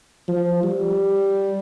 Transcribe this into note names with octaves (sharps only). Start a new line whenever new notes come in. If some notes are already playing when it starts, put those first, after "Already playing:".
F3
G3